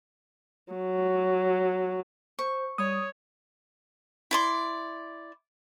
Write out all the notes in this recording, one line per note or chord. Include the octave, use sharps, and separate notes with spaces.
F#3
C5 C#6
G3 C#5 D#6
E4 D5 C6